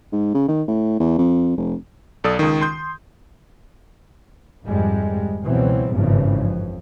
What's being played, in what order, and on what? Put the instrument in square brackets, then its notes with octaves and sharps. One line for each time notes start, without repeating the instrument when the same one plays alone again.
[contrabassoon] G#2
C#3
D#3
A2
E2
F2
F1
[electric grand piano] B1 A4 D5 D#6
C#2 D#3
C6 G6
[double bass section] G#1 F2 G3 G#3
C#2 B2 E3 F#3 G3 C4
G#1 E2 G2 C#3 E3 F3
F2